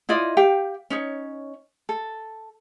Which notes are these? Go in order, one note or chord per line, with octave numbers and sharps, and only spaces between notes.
E4 F4 D5 D#5
G4 F5 G5
C#4 D#4 C#5
A4